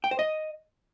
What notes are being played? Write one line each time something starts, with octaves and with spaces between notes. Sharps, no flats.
G5
C5
D#5